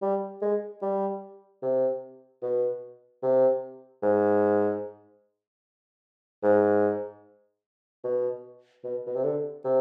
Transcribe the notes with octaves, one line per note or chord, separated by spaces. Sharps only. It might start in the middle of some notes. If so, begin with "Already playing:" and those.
G3
G#3
G3
C3
B2
C3
G#2
G#2
B2
B2
B2
C3
D3
C3